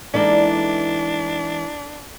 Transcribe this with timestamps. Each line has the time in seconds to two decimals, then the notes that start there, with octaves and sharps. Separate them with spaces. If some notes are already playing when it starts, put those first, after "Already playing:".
0.14 E3 G#3 A#3 D4 D#4 A4 D5